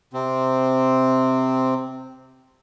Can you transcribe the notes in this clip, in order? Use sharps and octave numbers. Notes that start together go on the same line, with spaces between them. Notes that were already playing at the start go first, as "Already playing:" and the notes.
C3 C4